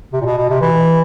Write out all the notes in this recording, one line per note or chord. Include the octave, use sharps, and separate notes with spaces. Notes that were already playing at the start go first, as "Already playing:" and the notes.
C3
A#2
B2
B2
C3
E3